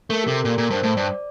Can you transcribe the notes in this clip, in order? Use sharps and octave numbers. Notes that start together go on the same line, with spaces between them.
A3 A#4
G4
C3 A4
A#2 A#4
A#2
G2 C5
A2
G2 D5